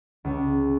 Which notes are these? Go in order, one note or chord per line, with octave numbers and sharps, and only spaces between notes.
C#2